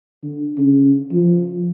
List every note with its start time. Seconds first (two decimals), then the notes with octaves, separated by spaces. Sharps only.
0.23 D3
0.58 C#3
1.13 F3